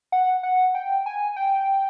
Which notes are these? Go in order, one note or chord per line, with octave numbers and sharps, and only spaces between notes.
F#5
F#5
G5
G#5
G5